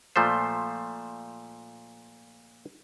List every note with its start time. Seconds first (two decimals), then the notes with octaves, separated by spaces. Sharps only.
0.16 A#2 F3 A3 C5